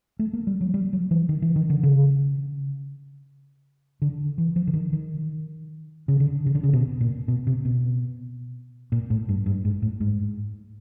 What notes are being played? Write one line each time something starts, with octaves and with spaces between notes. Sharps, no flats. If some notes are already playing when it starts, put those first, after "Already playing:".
A3
A#3
G3
F#3
G3
F#3
E3
D#3
E3
D#3
D3
C#3
D3
E3
F3
D3
D#3
D#3
C#3
D3
C#3
D3
C#3
B2
A#2
B2
C3
B2
A#2
A2
G2
G2
G#2
A2
G#2